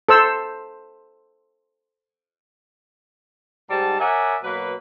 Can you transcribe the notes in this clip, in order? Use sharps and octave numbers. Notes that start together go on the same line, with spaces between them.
A4 C5 E6
G#2 G3 A5
A#4 C#5 D5 E5 F#5 G#5
B2 F#3 A#3 B4